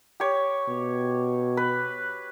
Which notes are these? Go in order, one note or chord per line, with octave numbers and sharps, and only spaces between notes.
G4 C#5
B2
B4